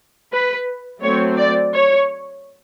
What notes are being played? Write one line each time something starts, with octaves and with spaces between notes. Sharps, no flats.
B4
F#3 A3 C4 C#5
D5
C#5